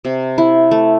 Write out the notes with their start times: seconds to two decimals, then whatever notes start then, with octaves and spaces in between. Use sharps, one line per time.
0.05 C3
0.38 E4
0.71 A3